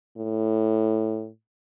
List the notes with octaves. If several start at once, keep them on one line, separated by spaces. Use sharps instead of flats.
A2